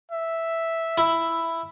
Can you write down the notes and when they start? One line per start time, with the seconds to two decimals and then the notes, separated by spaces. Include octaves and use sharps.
0.11 E5
0.98 E4